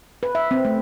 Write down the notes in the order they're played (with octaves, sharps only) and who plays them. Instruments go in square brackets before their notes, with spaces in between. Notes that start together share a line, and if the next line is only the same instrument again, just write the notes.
[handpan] B4
E5
C4
A3